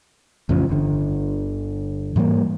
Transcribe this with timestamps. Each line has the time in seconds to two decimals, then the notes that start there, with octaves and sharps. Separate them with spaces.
0.49 A1 F2 C#3 F3
0.69 G1 D3
2.16 G#2 E3 G3 A#3